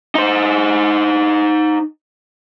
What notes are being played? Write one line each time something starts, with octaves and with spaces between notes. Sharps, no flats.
D#4 C5